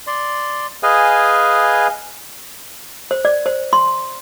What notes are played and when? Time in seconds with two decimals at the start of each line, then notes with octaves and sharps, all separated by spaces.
0.07 D5 C6
0.83 G#4 B4 D#5 F5 G#5
3.11 C5
3.25 D5
3.46 C5
3.73 C6